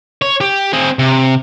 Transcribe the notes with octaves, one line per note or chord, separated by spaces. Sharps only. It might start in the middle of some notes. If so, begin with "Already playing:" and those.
C#5
G4
C4 G#4
C3